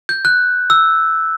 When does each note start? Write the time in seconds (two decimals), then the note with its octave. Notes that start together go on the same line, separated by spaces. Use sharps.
0.09 G6
0.25 F#6
0.70 E6